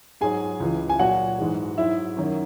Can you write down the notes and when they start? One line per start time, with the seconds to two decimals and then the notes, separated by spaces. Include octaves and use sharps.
0.21 G#2 F#3 G#4 G#5
0.60 C#2 C#3 E3
0.89 G#5
0.99 A#2 F#3 F#4 F#5
1.39 G#2 E3 G#3
1.78 G#2 F#3 E4 E5
2.17 F#2 D#3 F#3